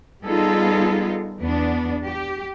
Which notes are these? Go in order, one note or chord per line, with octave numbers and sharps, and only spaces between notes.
G3 B3 D#4 F4 G#4 A4
E2 B3 D4
G4